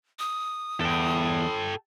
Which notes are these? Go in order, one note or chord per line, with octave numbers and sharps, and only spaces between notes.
D#6
E2 A4 G5